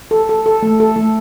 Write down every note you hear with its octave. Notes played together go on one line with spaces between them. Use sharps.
A4
A4
A4
A3
A4
A3